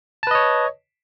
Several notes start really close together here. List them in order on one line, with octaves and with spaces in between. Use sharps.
A5 B4 D#5 C#5